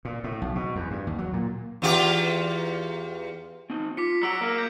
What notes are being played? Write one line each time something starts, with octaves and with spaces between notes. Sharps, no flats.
A#2
A2
B1
B2
E2
G2
D#2
F#3
A#2
E2 F4 G4
C4 D#4
F4 D6 B6 C#7
F#3 A#5 E6 D7
A#3
D6 G6